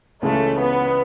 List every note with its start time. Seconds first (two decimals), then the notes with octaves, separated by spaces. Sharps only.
0.22 C#2 C#3 E3 G#3 A3 C#4
0.58 B3